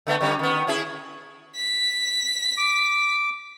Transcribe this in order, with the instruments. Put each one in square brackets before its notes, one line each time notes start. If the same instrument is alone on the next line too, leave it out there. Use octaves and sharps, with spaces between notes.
[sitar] D3 A3 B3
D3 G3 C#4
D#3 B3
C#4 E4 G#4
[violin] B6
[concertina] D6